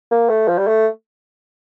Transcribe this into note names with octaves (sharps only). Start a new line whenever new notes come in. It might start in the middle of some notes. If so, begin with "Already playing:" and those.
A#3
A3
F3
G3
A3